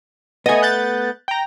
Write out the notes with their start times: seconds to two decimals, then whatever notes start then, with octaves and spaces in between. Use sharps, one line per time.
0.46 A3 B3 D#5 G#5
0.62 F#6 G6 A6
1.28 G5 A#5